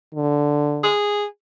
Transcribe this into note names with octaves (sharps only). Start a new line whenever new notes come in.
D3
G#4